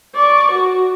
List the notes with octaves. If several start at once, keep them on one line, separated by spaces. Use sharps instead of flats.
D5 C#6
F#4